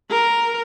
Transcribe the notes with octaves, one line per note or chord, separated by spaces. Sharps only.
A#4